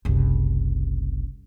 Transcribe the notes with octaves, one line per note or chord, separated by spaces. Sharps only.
F#1 C2